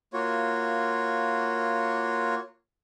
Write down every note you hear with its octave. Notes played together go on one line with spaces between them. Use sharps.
A#3 F4 F#4 C#5